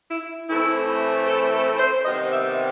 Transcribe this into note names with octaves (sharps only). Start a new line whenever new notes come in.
E4
A2 E3 A3 C4 E4
A4
A4
C5
C3 D#3 G3 B3 D#5
E5